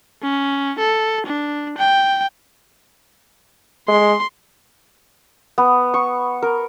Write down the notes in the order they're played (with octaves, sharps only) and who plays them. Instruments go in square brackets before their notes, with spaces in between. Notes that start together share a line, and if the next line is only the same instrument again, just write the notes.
[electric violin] C#4
A4
D4
G5
[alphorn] G#3 [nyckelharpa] C6
[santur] B3
C#6
A#4